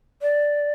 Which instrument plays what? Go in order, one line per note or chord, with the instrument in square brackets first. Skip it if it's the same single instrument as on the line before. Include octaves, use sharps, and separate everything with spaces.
[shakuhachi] D5